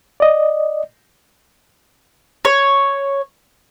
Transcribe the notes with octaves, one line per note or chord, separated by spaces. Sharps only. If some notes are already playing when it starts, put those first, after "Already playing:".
D5 D#5
C#5